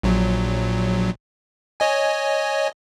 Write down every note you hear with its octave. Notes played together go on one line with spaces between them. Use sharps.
A#1 A#2 F#3
C#5 D#5 G#5